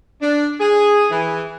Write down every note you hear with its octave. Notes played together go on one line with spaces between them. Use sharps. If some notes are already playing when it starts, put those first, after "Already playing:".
D4
G#4
E3